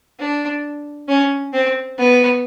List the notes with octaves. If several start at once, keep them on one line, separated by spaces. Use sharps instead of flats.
D4
C#4
C4
B3